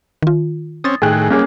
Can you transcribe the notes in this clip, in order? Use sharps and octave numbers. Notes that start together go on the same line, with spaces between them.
D#3 F4
C4 C#4 D#6 A6
A2 D#3 G#4 G5 F#6
G3 A#3 C#4 G#4